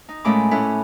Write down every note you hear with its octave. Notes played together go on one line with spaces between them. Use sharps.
D#4
A#2 G#3 A3 C#4 B5 D6
A2 C#4 E4 B4